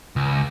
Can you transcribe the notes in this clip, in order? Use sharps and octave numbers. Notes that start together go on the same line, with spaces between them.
C#2